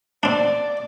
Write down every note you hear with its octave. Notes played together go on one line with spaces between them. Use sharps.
C4 D4 D5